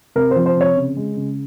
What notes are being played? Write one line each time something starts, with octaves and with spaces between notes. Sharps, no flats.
C3 A#4
C5
F3
C5
C3 C#5
C#3
G#3
C#3